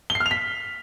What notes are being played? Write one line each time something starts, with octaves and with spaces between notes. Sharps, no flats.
G7
C7
F6
F7
B6